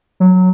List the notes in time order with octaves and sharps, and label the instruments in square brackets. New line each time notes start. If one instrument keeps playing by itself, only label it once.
[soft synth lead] F#3